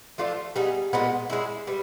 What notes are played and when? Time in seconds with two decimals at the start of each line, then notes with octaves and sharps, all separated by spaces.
0.18 F3 A3 D4 F4
0.56 G3 B3 D#4 G#4
0.93 A#2 F3 G#3 B3
1.30 G#3 C#4 E4
1.67 G3 B3